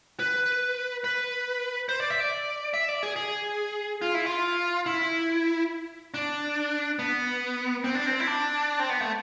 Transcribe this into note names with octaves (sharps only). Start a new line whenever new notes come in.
B4
B4
C5
D5
E5
D5
E5
D5
G#4
G#4
F4
E4
F4
E4
D4
B3
C4
D4
C4
E4
D4
C4
B3
A3